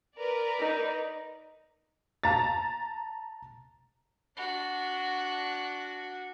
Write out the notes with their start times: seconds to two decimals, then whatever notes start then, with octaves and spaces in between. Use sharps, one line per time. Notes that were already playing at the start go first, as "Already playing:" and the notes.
0.15 A#4 B4 D5
0.60 D#4
2.24 A5 A#5 A6
4.36 D4 F#4